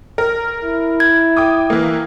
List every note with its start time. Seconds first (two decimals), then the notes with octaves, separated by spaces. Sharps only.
0.18 A#4
0.64 E4
1.00 G#6
1.37 G5 D6 D#6
1.70 E3 A#3